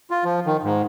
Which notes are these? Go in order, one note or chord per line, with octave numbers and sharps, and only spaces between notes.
F4
F3
D#3
G#2